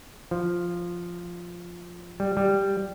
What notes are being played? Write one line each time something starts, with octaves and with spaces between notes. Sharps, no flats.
F3
G3
G3